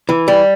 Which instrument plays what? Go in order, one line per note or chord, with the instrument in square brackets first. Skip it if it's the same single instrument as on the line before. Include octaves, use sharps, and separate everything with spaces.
[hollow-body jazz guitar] E3
G3